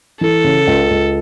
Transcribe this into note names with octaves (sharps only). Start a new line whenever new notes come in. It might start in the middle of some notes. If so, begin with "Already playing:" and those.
E3 A4
C#3
C#2
C#2